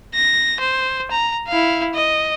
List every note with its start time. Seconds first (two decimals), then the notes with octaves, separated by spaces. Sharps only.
0.14 A#6
0.60 C5
1.11 A#5
1.48 E4 F5
1.94 D#5